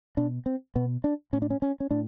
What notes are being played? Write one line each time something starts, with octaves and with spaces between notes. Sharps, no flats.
B2 D4
C4
B2 B3
D4
A2 C#4
D4
C#4
C#4
C#4
A2 D4